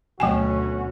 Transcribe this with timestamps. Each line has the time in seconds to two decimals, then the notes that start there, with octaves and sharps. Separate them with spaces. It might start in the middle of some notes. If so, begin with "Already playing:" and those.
0.20 D2 B2 F#3 C#4 F#4 G5 G#5